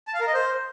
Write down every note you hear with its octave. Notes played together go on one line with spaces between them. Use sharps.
A5
F5
A#4
D#5
C5